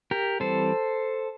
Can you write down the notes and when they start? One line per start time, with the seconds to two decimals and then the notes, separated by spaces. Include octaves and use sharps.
0.11 G4 A#4
0.40 E3 G3 C4 A4 C5